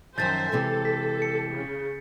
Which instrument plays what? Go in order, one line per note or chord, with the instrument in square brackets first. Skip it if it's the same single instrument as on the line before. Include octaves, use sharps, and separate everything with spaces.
[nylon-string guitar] F#2 D#3 F3 [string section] C5 E5 G#5 [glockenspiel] G6 A6
[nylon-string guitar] C3 E3 G#3 [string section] A4
[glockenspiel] B6
C#7
[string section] C#3